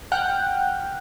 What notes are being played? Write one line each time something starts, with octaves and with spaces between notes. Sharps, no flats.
F#5 G5 F6